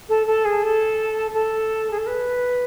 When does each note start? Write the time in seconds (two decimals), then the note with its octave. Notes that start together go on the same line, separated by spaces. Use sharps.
0.09 A4
0.27 A4
0.45 G#4
0.63 A4
1.34 A4
1.91 G#4
1.98 A4
2.07 B4